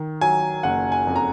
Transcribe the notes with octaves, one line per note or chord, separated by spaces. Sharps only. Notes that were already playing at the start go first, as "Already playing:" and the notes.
Already playing: D#3
F#3 G#5
F#1 F#5
G#5
F2
A#5